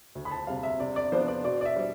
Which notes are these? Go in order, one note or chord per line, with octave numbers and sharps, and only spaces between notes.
D2
B5
A5
C3 G3 F5
E5
C3 D5
D5
F3 B3 D4 C5
D5
B2 D5
D5
E5
G3